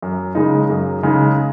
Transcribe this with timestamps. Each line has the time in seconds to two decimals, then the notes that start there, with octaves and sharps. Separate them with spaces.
0.02 F#2
0.35 C#3 G#3 D#4
0.70 F#2
1.03 C#3 G#3 D#4